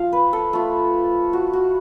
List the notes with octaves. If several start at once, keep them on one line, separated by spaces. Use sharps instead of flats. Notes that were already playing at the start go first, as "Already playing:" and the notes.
Already playing: F3 F4 F5
B4
A4
A3 F4
F#4
F#4